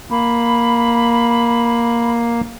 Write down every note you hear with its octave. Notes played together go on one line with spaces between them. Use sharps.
A#3 B5